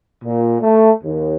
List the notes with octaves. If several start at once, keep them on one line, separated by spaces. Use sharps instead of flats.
A#2
A3
D#2